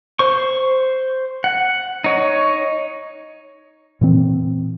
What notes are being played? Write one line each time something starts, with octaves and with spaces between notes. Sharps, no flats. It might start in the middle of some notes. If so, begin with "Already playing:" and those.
C5 C#6
F#5
D#4 C#5
A#2 E3 C4